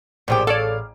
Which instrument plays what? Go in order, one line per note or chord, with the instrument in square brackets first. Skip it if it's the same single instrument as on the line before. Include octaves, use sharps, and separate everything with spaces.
[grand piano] A1 G#4 D6 [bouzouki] A#2 F3 G4
[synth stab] A4 C#5 D5 [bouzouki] F5